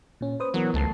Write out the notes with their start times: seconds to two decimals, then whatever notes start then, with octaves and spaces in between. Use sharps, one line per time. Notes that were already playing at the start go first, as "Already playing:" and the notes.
0.21 A#2 C#4
0.40 B4 C5 D#6
0.54 E3 F#3 B3 A#4
0.74 C#2 A3 A5 C7